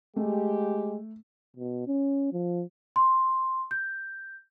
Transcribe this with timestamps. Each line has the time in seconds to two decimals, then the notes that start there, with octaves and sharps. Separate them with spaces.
0.16 G#3 A3 G4
1.57 B2
1.87 C#4
2.33 F3
2.96 C6
3.71 G6